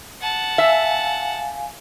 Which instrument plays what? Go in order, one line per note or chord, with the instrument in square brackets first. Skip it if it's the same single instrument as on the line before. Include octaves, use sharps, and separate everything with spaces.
[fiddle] F#5 A5
[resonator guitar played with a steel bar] E5 [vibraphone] F5 G#5